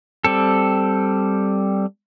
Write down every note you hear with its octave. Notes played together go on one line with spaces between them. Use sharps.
G3 C4 A4